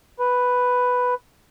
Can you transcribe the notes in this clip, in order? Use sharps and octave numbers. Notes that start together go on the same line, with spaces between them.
B4